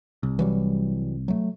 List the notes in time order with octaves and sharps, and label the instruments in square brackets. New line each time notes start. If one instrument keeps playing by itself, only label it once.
[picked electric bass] C2
[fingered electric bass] E3 F#3 G3
F#3 A3